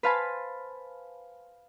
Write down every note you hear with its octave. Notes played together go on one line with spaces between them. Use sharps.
B4 C5 F5 G#5 A5 B5